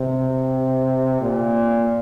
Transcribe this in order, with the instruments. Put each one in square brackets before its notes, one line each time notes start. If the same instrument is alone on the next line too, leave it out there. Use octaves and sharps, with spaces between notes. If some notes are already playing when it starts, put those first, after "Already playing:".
Already playing: [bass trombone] C3
A#2